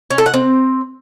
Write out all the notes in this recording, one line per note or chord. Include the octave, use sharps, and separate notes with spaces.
C#4
A4
F#5
C4